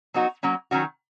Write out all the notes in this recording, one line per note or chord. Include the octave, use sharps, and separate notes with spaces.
F#3 B3 D#4 F#4
F#3 A#3 C#4
D#3 F#3 C#4 F#4